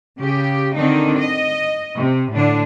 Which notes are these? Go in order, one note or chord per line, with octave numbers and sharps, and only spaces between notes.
C#3 G4
D3 D#3 C4 D4 D#4
D#5
C3
A2 D3 D4